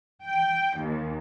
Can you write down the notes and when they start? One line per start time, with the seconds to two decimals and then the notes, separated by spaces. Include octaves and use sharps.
0.24 G5
0.78 D#2